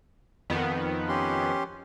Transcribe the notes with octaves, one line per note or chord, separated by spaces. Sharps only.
F2 D#3 B3
C#4 G4 C6